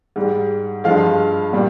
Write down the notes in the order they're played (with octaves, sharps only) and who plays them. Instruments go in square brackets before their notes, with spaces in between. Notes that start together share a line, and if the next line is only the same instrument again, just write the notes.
[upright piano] G#2 G3
G2 F3 G#3 F5
A#2 G3